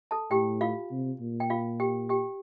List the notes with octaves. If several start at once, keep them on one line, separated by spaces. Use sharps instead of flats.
A4 A5
A2 G4 G5
F4 F5
C3
A#2
G5
F4 F5
G4 G5
G4 G5